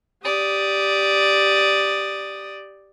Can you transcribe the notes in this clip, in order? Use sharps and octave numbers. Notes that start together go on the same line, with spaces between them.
G4 D5 D#6